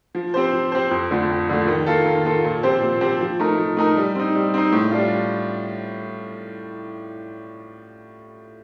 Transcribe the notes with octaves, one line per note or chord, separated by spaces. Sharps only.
F3
C4 G4 C5
F3
C4 G4 C5
F2
D3 F3 A3
F2
D3 F3 A3
D#3
A#3 F4 A4
D#3
A#3 F4 A4
A#2
F3 C4 G4 C5
A#2
F3 C4 G4 C5
F3
A3 D#4 A#4
F3
A3 D#4 A#4
G3
C4 D#4
G3
C4 D#4
A2
G3 D4 F4